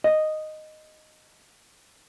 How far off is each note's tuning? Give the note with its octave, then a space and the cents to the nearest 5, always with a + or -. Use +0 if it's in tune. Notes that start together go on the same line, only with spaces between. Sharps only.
D#5 -5